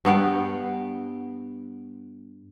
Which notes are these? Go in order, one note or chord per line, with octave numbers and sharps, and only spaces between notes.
G2 B3 F5 G5